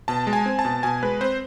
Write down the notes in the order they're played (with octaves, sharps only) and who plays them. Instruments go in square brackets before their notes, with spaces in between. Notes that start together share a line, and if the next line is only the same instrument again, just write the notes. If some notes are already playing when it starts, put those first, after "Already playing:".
[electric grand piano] B2 A5
G#3
G#5
C4
A5
B2
B2 G#5
G#3 B4
C4 C5